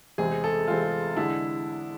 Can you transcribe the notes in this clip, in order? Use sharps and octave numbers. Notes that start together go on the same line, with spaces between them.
E2 C3 G#3 C4 G#4
A4
E2 C3 G#3 C4 F4
D3 G#3 D4 E4